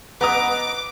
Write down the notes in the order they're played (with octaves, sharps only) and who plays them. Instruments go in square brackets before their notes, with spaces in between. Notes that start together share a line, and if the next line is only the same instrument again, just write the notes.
[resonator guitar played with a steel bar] B3 D#5 [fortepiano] B4 A#5 D#6 [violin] D6